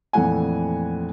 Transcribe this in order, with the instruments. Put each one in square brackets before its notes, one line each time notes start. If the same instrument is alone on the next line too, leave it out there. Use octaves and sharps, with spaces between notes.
[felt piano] F2 A#2 E3 A3 F#5 G#5